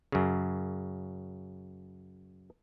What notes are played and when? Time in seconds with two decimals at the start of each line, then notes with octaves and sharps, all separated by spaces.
0.12 F#2 C#3